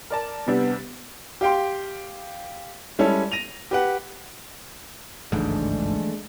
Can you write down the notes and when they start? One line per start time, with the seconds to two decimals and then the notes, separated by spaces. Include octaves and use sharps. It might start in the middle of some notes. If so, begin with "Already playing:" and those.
0.10 A#4 D5 A5
0.47 C3 G3 B3 D4
1.41 G4 F5 G5 C6
2.99 G3 G#3 C#4 E4 A4
3.32 A#6 D#7 F7
3.71 G4 B4 F#5
5.32 G1 C#2 G#2 E3 F3 G#3 A3 D4